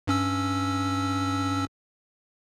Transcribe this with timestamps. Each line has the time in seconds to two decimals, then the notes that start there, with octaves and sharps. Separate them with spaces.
0.07 G2 C#4 E6